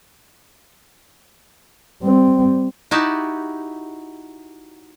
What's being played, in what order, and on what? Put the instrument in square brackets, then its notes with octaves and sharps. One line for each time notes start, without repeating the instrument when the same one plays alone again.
[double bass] G3 C4
[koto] D#4 E4 F#4 G4 A5